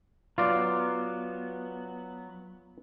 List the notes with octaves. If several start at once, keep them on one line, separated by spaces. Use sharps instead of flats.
F#3 B3 F4 D5